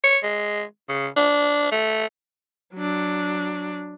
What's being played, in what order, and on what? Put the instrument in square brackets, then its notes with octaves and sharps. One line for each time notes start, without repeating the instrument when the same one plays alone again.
[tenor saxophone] C#5
G#3
C#3
D4
A3
[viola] F#3 D4